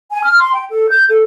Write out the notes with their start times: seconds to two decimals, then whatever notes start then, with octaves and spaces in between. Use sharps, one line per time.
0.12 G#5
0.24 F6
0.39 C6
0.53 G5
0.69 A4
0.90 G6
1.09 A4